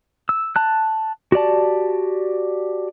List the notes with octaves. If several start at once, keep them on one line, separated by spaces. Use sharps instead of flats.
E6
A5 F#6
F#4 G4 D5 A5